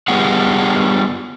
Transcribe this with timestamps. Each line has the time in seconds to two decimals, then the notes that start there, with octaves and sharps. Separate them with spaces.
0.08 G3 B3 F4 G4 G#4 F#5